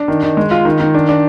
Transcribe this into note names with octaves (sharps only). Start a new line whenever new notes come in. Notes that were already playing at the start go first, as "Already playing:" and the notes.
Already playing: D4
D#3
D#3
G#3
F4
D#3
D#3
D4
D4